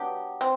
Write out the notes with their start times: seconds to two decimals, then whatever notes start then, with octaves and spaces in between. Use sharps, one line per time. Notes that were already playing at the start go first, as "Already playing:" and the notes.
Already playing: F#3 B3 D4 G4
0.41 C4